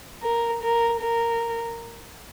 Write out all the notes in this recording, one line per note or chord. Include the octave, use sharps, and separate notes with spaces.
A#4
A#4
A#4